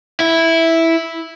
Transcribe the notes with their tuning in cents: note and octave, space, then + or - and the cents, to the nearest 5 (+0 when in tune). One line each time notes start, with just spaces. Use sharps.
E4 -5